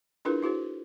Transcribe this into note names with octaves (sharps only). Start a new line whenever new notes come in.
D4 E4 F4 G#4 A#4 B4
E4 F#4 G#4 C5